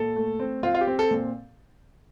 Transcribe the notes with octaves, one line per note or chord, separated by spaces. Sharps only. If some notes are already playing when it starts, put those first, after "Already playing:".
Already playing: A#2 A4
A3
C4
C4 F4
F4
G4
C4
A4
A#2